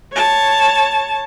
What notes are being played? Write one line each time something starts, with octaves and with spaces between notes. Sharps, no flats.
C#5 A5